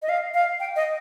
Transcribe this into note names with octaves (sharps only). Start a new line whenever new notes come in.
D#5
F5
F5
G5
D#5